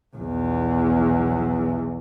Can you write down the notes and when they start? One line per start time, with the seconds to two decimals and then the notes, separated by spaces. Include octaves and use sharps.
0.15 B1 E2